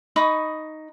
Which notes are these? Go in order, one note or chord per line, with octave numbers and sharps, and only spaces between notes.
D#4 B5 C#6 D#6